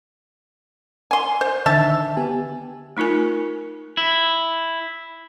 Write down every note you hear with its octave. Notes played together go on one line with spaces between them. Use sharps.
G#5 C6
C5
D3 D#3 E5 A5
B3 G4 G#5
A3 D#4 F4 A#4 G#5
E4